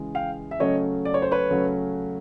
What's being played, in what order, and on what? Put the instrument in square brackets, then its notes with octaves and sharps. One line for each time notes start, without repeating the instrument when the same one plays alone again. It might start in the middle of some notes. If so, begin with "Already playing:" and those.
Already playing: [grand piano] C#3 E3 G#3
F5 G5
E5
C#3 F#3 A3 C#4 C#5 D#5
D5
C#5
C5
B4 C#5
C#3 F#3 A3 C#4